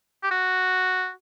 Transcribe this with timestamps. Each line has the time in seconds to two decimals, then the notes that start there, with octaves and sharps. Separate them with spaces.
0.23 G4
0.31 F#4